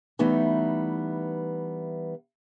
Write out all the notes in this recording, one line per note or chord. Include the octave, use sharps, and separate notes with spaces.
E3 G3 A3 B3 D#4